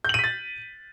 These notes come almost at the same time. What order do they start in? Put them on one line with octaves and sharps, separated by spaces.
G6 F#7 D#7 B6 A6